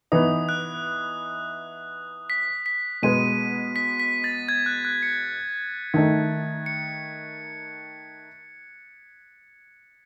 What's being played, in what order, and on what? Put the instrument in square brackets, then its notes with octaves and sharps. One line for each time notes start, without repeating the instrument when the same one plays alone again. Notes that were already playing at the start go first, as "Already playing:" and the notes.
[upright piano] E3 B3 D#4 [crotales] D#6
[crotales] F#6
B6
B6
[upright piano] B2 G#3 B3 [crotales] D#7
[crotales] B6
B6
A6
G#6
F#6
F#6
C#7
[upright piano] D#3 A3 D#4
[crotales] C#7